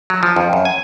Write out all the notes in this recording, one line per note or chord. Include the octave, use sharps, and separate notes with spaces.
F#3
F3
F2
F#2
G#5